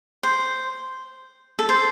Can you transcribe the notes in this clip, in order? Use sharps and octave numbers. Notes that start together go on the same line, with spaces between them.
C5
A4
C5